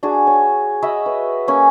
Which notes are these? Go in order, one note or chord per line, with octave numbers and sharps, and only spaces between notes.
D4 F#4 G#4
C#5
F#4 D#5 E5 B5
B4
A#3 C#4 G#5